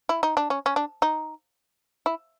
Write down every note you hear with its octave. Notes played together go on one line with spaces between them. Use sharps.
E4
D#4
D4
C#4
C#4
D4
D#4
E4